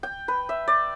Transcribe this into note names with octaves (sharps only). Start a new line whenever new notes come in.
G5
B4
E5
D5